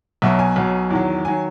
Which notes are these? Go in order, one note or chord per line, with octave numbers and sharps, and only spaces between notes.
B1 B2 F#3 E5
G#5
B1 B2 F#3
E2 D#3 F#3
D#3 F#3 G#5